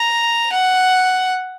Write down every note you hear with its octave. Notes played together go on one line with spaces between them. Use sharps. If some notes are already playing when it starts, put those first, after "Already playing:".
Already playing: A#5
F#5